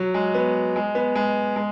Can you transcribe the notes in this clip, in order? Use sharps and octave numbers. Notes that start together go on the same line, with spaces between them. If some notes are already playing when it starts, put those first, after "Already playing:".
Already playing: F#3
G#3
B3
G#3
B3
G#3
G#3